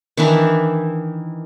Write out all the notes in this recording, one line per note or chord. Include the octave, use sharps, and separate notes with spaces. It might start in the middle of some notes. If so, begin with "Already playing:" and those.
D#3 E3 D4 E4